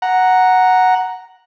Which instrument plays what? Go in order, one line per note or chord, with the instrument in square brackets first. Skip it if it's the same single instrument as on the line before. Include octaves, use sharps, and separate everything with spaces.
[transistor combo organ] F#5 A#5